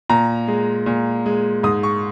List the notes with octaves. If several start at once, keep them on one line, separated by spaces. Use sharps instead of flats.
A#2 A#5
G#3
A#2
G#3
G#2 D#6
C#6